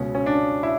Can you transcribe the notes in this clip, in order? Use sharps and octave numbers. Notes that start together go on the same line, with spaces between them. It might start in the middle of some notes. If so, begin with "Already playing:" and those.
Already playing: C#2 B2 C#4
C#4
D4
E4